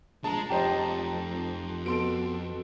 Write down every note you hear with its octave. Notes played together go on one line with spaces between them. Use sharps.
A#1 G#3 A5 A#5
F1 F2 G4 C5 D#5
B2 A4 C6 D7